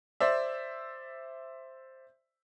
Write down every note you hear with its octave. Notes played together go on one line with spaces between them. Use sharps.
C5 D5 E5